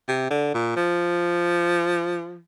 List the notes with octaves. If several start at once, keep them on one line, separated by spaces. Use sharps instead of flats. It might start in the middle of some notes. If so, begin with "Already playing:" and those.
C3
D3
A#2
F3